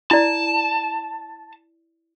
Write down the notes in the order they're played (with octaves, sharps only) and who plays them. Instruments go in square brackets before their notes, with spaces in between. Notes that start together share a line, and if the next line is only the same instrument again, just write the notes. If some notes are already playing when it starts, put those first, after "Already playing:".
[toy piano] E4 D5 [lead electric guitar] A5